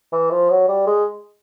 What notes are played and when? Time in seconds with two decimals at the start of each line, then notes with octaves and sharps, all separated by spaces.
0.12 E3
0.30 F3
0.50 F#3
0.68 G3
0.87 G#3